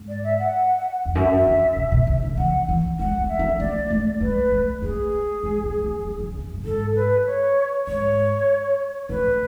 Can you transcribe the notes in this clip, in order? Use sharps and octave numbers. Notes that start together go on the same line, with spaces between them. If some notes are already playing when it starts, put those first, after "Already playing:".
Already playing: G#2
D5
E5
F#5
E2
F#2 E5
E2
B2
B2
C#3
D3
E3 F#5
E3
G#3 F#5
A3
E5
B3
A3 D5
A3
G#3 B4
A3
A3 G#4
G#3
B3
A3
F#3
C#3
E2
F#2
G#2 A4
B4
C#5
G#2 C#5
A2 B4